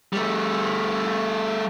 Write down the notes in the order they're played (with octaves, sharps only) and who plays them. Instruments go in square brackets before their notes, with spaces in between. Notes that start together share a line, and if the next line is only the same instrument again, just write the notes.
[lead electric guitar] G3 A3